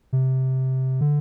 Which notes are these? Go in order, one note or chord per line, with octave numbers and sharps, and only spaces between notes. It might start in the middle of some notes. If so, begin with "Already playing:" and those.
C3
D3